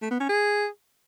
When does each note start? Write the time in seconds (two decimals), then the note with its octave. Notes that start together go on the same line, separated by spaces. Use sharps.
0.02 A3
0.11 B3
0.20 C#4
0.29 G#4